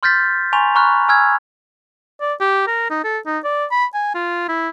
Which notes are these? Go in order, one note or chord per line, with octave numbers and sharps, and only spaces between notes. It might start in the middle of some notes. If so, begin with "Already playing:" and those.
C6 F6 G6 A6 B6
G#5 A#5 C6 C#6 F7
A#5 B5 C#6 F6 F#6
G#5 E6 F6 G#6
D5
G4
A#4
D#4
A4
D#4
D5
B5
G#5
F4
E4